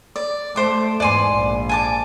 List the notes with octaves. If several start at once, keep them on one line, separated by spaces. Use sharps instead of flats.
D5
A3 C5 D6
E2 G#2 D5 G#5 C6
A#1
G#5 A5 D6